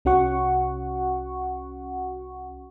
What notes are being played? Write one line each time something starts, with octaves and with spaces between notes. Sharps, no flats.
C2 C#4 F#4 F#5 C#6